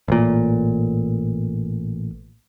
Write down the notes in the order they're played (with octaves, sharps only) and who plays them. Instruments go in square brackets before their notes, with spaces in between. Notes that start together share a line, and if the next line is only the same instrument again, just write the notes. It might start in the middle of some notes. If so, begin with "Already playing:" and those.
[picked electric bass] A1 A#2